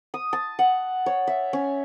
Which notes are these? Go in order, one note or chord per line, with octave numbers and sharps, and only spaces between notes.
D#6
A5
F#5
C#5
E5
C#4